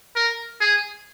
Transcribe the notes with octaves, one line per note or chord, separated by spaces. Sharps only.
A#4
G#4